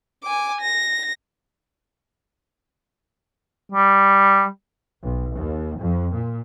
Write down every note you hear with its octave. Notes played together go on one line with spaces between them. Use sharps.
G#5 D6
A#6
G3
B1
D#2
F2
A#2